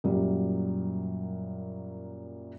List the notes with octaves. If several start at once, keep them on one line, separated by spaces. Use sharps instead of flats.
F#2 A#2 F#3 G3